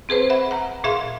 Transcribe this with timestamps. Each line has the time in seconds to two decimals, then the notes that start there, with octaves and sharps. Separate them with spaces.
0.09 C4 G#4 B4 C5
0.30 E5 F#5 B5
0.51 F#5 A#5
0.84 A#2 G#4 E5 F5 C6